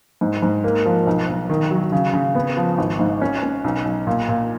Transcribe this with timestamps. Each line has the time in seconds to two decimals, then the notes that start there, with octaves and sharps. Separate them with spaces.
0.21 G#2
0.42 G#2
0.64 A#3
0.86 F3
1.07 B1
1.29 B1
1.50 D#3
1.71 F#3
1.92 C#3
2.13 C#3
2.35 B3
2.57 F3
2.78 G#1
2.99 G#2
3.22 C#4
3.43 C#4
3.64 B1
3.85 B1
4.07 A#2
4.29 A#2